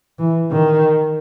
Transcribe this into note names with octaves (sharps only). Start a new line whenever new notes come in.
E3
D#3